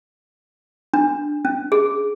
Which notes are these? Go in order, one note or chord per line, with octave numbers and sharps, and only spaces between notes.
D4
C#4
G#4